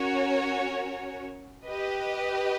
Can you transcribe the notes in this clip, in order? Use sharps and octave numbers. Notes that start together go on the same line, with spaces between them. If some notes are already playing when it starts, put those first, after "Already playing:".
Already playing: C#4 F#4 A#4 C#5
G4 B4 D#5